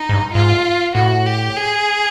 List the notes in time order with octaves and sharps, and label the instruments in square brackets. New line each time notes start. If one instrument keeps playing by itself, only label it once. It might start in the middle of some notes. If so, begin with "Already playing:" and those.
Already playing: [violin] D#4
[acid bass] G#2
G2
[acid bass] G#2 [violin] F4
[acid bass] A2 [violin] F#4
[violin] G4
G#4